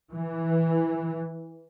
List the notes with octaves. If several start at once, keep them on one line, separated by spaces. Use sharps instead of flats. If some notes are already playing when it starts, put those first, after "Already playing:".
E3